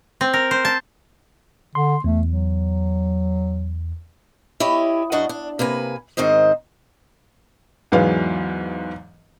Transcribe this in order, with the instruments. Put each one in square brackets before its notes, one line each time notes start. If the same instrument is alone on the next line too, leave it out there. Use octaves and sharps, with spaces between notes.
[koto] C4
A#4
C5
A5
[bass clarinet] D3 [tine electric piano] C6
[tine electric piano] E2 [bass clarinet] A3
[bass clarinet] F#3
[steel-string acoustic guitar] E4 G4 C#5 D#5
F#2 D4 F#4 D#5 F#5
D4
C3 A#3 B4 G#5
G#2 D#3 C4 C5 D#5
[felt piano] E2 G#2 E3 F#3 B3 F5